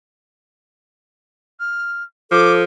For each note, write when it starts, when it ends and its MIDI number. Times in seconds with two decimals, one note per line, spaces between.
1.59 2.03 89
2.31 2.64 53
2.31 2.63 69
2.31 2.52 86